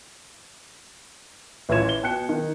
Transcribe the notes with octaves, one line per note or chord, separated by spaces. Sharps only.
A1 E3 F4 C#5 G#6 E7
G7
B2 G5 F#6 C#7
D#3